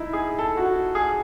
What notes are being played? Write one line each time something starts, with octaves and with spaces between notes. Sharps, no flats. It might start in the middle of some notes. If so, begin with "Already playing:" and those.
Already playing: D#4 E4
G#4
A4
F#4
G#4